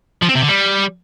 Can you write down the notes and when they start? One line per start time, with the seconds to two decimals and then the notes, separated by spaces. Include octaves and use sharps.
0.22 F3
0.29 C4
0.35 C3
0.42 D3
0.49 G3